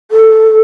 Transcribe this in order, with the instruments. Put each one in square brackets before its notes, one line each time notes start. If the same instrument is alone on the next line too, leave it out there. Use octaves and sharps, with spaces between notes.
[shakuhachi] A4